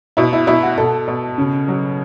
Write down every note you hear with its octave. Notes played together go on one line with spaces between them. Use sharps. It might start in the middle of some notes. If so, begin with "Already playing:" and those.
B2 E4
E4
B2 E4
F#4
B2 A4
B2
C#3
F#3